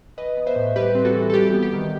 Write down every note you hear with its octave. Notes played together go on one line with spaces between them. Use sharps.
E3 B4 D#5
B3
C5 E5
A2
G3 G4 B4
C4
F#4 A4
E3
A4
G3 G4
B3
G4
D#3